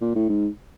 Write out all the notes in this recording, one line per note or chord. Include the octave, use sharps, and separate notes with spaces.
A#2
A2
G#2